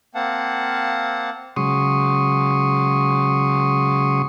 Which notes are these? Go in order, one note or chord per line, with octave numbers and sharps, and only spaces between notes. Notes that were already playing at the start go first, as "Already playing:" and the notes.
A#3 C4 F5 F#5 A5
C#3 F#3 G#3 C6 C#6 D#6